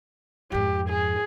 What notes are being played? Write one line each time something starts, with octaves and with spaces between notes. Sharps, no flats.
F2 G#2 G4
G#4